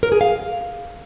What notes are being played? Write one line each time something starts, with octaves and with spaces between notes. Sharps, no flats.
A#4
G#4
F5